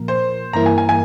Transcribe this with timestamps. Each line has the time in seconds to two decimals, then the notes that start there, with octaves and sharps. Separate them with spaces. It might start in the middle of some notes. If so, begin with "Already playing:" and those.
Already playing: A#2 F3 A#3 A#4
0.08 C5
0.53 G2 E3 A#3 E4 A#4 A#5
0.66 G#5
0.78 G#5
0.89 G#5